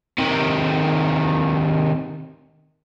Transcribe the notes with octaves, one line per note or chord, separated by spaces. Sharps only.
C3 D#3